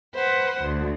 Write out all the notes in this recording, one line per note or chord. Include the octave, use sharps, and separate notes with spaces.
B4 C5 F#5
D2